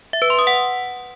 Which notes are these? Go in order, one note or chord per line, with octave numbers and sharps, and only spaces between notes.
E5
B4
C6
D#6
F#5